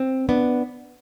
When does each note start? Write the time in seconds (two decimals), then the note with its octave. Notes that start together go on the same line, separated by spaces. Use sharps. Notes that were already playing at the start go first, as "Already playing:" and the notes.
Already playing: C4
0.29 B3 D4